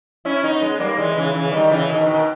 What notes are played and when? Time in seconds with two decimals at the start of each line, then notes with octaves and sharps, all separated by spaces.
0.25 C#4 E4
0.44 B3 D#4
0.62 G#3 B3
0.76 B3
0.79 G3 A#3
0.98 E3 G#3
1.16 C#3 E3
1.34 C#3 E3
1.52 D#3 G3
1.71 C#3 E3
1.89 B2 D#3
2.06 B2 D#3